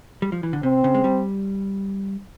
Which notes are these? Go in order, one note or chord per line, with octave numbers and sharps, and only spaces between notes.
G3
F3
E3
D3
C3 C4
C#3
G#3
G3